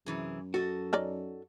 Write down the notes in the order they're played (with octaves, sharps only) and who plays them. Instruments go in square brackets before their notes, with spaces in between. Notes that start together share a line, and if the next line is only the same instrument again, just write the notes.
[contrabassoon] F#2 [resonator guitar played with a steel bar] C3 E3 G#4
[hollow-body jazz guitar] F#4 [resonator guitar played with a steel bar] A4 D#5
[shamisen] C#4 D#4 D5